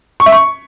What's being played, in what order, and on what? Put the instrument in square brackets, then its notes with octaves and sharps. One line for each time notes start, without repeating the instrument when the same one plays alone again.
[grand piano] C#6
E5
C#6